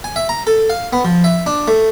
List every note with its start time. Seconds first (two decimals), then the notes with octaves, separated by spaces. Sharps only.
0.04 G#5
0.16 E5
0.29 A#5
0.47 A4
0.70 F5
0.93 B3
1.05 F3
1.24 E5
1.46 D4
1.68 A3